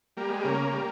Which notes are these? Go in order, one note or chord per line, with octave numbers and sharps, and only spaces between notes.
G3 A#3
G#3
C#3 A#3
G3